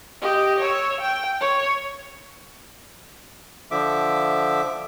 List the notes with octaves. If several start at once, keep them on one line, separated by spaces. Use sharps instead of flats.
G4 D#5
C#5 E6
G5
C#5
D3 F3 E5 D6